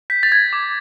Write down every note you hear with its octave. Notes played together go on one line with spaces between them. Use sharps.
G6 B6
A6
G#6
D6